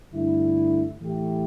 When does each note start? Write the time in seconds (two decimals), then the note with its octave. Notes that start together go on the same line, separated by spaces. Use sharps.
0.12 G2 D3 A3 E4
1.00 A2 E3 A3 E4 G4